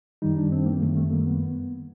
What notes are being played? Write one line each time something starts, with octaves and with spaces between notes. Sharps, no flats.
F#2 D#3 G3 D#4
D4
C4
A#3
F#2 D#3 G3 A3
A3
A#3
B3